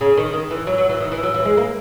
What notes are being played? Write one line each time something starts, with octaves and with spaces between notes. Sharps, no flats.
C#3
D#3
D#3
E3
F#3
F#3
E3
D#3
E3
F#3
E3
G#3
A#3